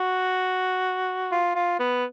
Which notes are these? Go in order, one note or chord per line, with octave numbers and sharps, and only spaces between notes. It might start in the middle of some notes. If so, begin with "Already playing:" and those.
Already playing: F#4
F4
F4
B3